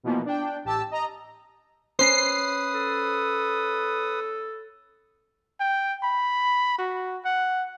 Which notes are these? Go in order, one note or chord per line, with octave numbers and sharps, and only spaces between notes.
B2 E3 F3 A#3 B3
D4 G5
A1 G4 A5 E6
D#5 A#5
C#4 B4 C5 D#6 C7
A4
G5
B5
F#4
F#5